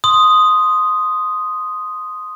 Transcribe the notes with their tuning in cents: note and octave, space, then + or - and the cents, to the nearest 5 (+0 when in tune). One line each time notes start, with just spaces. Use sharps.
C6 +0 D#6 +0